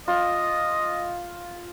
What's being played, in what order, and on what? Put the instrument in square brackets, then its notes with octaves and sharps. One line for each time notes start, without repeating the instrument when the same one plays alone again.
[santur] F4 [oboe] D#5